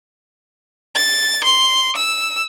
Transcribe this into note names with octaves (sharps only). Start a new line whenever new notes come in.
A6
C6
E6